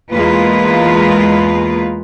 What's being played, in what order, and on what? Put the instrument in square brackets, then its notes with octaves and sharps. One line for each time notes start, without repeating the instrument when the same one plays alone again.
[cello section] E2 G#3 A#3 F4 B4